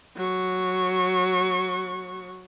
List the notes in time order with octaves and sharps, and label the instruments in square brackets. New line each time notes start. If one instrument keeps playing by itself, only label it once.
[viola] F#3 C#6